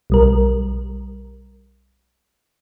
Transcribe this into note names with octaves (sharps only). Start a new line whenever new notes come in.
B1 G3 A#4